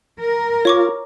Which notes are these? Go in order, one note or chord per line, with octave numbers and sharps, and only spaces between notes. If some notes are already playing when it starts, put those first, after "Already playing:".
A#4
F4 C#5 C#6 D6